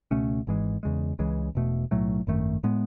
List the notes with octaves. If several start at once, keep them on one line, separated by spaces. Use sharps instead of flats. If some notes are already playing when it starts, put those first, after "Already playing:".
C#2 B2 A3 C#4
G#1 G#2 E3 G#3
E2 C#3 G#3
C#2 C#3 E3 G#3
E1 E2 B2 A3
B1 A2 F#3 A3
G#1 F#2 D#3 A3
A2 G#3 B3